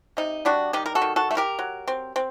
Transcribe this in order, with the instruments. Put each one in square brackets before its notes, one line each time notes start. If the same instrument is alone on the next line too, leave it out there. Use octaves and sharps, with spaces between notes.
[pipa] C3 D#4
G3 D4 F#4
D#3 D#4 G4
A#4
F#4 A4
D#3
F#4 A4
A3
G4 A#4
F#3
C4
C4